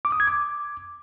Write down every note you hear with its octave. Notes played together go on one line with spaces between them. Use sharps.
D6
D#6
G#6
D6